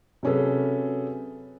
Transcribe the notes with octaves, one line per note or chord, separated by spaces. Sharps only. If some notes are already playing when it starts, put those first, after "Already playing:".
C3 F#3 C#4 G#4 A4 B4